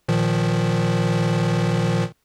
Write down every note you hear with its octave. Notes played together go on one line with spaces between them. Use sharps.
A#2 D#3 F3